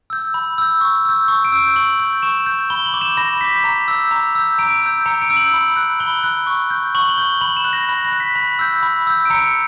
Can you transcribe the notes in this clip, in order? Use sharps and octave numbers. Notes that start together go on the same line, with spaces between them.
E6 G6
B5
E6 G6
C#6
E6 G6
C#6
D7
E6 G6
D7
C#6 F#7
G6
C#6 E7
G6
B5 G7
F#7
D6 G6
E7
B5 A#6
D6 G6 B6
A#5
E6 G6
A#5
E6 G6
A#5 D7
E6 G6
A#5 C#7
D7
E6 G6
F#7
B5
F#6
B5 G7
F#6
C#6
G6
C#6 F#7
G7
F#7
G6 G7
B5 F#7
E7
F#6
A#6
B5 A#6
A#6
F#6
B6
B5
E6 G6
B5
E6 G6
D7
A#5 C#7